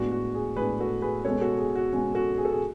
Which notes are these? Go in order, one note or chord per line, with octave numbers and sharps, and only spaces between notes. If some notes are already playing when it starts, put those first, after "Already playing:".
Already playing: A2 G#3 B3 D4 F#4
F#4
G#4
A2 G#3 B3 D4 G#4 B4
F#4 A4
G#4 B4
B2 G#3 C#4 A4 C#5
F#4 A4
G#4
F#4
B2 G#3 C#4
F#4 A4
G#4
A4
G#4